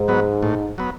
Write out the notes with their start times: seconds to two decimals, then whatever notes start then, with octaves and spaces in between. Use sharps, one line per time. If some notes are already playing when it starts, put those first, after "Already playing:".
Already playing: G#2
0.08 F#3 B3
0.43 A2
0.78 F#3 B3